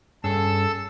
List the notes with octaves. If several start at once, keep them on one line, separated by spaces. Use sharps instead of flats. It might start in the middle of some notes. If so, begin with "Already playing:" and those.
G2 C#4 G#4 A4 E6